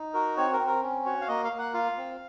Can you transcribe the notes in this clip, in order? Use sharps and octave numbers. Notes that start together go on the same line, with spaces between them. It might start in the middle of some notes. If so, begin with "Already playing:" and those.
Already playing: D#4
F#4 A#4
C4 C#5
A#4
C4
A#4
C#4
F#4 C#5
F5
A#3 D#5
F5
A#3
F#5
F4 F5
C4